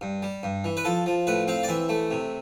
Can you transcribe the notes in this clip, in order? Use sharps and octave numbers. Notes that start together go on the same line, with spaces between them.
G2
G3
G2
E3
B4
F3 A4
F3
A2 B4
C4 F5
D5
E3 E5
A3
C3